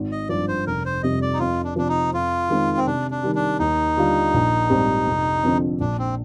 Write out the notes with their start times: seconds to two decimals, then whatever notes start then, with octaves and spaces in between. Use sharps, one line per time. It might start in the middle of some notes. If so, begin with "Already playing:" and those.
Already playing: G#1
0.12 D#5
0.29 G2 F3 D5
0.48 C5
0.67 F1 A#4
0.85 C5
1.03 F2 C3 G3 D#5
1.22 D5
1.33 D#4
1.40 F2 F4
1.64 D4
1.76 C3 F3 D4
1.88 D#4
2.13 F2 F4
2.49 D#3 G#3 C4
2.77 C4
2.87 C3 D4
3.11 D4
3.23 D#3 G3
3.35 D4
3.59 D#2 D#4
3.97 D3 G3 D4 F4
4.34 A#1
4.70 G#2 G3 C4 G4
5.06 F1
5.43 F2 D3 F3 C4
5.80 A#1 D4
5.98 C4